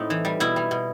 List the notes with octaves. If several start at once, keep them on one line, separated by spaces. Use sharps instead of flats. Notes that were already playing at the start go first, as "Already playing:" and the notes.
Already playing: A2 C4 D#4
E3
G3
B2 E4
G3
B2